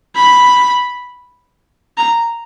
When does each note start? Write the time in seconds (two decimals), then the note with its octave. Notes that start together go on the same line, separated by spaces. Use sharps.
0.15 B5
1.98 A#5